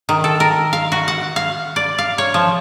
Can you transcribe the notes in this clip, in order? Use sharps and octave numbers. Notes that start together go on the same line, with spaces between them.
D#3
A4
A#4
F5
F#4
F#5
F5
D5
F5
C#5
F3